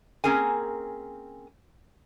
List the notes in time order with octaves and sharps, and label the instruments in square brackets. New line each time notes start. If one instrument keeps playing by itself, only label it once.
[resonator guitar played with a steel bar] A#3 C4 C#4 G#4 A#4 G#5